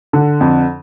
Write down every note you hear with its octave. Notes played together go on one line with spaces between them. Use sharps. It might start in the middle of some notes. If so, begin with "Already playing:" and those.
D3
F2